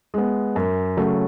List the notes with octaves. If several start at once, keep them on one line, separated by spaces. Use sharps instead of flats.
G#3 B3
F#2
C#3 F#3 A3